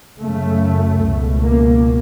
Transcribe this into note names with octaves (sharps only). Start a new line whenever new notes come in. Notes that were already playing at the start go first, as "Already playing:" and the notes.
F#2 C#3 A3
C#2 B2
A#3